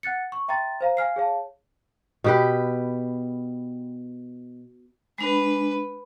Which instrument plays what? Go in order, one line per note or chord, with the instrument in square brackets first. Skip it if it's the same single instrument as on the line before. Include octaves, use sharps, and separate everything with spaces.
[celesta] F#5 F#6 A6 C#7
C#6
E5 G5 A#5 C6 A6
C5 F5 A#5
F5 G#5 F6 C7
G#4 C#5 F5 A5
[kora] B2 G4 B4
[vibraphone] G#3 D4 [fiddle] B4